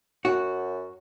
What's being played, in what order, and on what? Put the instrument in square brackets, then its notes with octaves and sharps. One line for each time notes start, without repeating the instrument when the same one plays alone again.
[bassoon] F#2 [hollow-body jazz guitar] F#4